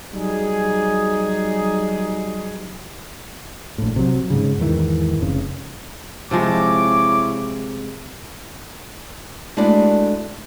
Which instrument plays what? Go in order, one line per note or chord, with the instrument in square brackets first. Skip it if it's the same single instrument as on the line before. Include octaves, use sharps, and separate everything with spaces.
[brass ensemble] F#3 G3 D#4 G#4
[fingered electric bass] A#1 A2
C3 F#3
G#2 C#3
E2 G#2 D#3 E3
F1 C#3
[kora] C3 F3 G#3 [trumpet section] E4 C#5 D6
[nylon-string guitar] G#3 A3 D4 E4 F#4 D5